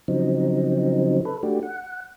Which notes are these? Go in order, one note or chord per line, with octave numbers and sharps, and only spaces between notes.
C#3 F3 F#3 C4 D#4
A4 B4
A3 D4 F#4 G4
F#5